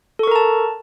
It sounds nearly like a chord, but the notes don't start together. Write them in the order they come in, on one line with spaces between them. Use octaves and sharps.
A4 C#6 A#4 A#5 A5